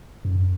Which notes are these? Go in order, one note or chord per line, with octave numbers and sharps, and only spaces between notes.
F#2